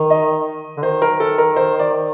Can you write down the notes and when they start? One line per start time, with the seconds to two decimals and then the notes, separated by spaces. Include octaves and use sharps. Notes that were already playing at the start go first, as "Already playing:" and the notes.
Already playing: D#3
0.10 D#5
0.77 D3
0.83 D#3 C5
1.02 A#4
1.20 A4
1.38 A#4
1.56 C5
1.79 D5